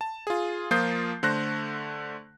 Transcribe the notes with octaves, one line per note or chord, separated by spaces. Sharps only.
A5
F4 G#4
F3 A#3 F4 D#6 G6 C7
D3 A3 C5 F#6 A#6